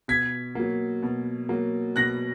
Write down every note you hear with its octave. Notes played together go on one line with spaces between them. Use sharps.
B2 G#6 B6
F#3 A#3
B2
F#3 A#3
B2 F#6 A#6